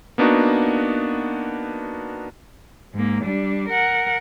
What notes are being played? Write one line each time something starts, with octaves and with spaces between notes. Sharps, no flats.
A#3 B3 D4 D#4 F#4
G#2 A#3
G3 D4
A#4 F#5